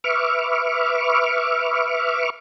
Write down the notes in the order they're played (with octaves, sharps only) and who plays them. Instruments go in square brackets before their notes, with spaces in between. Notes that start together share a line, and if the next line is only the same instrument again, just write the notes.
[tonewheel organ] B4 E5 C#6 D6 F6